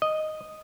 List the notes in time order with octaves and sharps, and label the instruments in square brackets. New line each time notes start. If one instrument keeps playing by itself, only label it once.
[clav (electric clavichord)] D#5